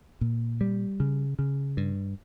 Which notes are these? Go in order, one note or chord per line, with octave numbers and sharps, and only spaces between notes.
A#2
G3
C#3
C#3
G2